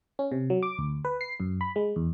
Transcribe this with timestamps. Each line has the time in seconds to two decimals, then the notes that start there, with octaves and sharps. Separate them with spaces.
0.19 C#4
0.32 C3
0.50 F#3
0.63 D6
0.78 D2
1.05 B4
1.21 C7
1.40 F#2
1.61 B5
1.76 G#3
1.96 E2